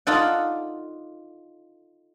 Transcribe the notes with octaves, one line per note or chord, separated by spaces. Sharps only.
D#4 F4 A4 D5 F#5